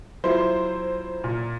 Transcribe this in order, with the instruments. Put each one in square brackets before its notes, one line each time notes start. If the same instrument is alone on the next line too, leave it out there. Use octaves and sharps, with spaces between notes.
[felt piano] F#3 E4 F4 [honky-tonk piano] C5
[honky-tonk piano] A#2